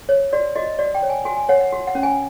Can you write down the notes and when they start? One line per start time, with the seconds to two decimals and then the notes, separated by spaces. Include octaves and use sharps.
0.09 C#5
0.33 F#4 D5
0.56 F#4 D#5
0.79 F#4 D5
0.95 G5
1.02 C#5
1.10 G#5
1.25 F#4 G#5
1.37 G#5
1.49 C#5 F#5
1.60 F#5
1.72 F#4
1.87 F#5
1.95 C#4
2.03 G#5